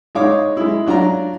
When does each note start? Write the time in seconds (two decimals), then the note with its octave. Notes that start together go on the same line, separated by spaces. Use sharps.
0.15 G#3 D#4 C#5 F5 D6
0.57 G#3 E4
0.86 F#3 D4 F4 D5 A#5